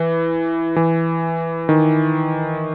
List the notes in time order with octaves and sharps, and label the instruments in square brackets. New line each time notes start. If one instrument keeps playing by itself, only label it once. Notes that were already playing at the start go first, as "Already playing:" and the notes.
Already playing: [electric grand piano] E3
E3
D#3